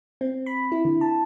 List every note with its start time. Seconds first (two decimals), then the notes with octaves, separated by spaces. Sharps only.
0.21 C4
0.46 B5
0.72 E4
0.85 D3
1.01 A5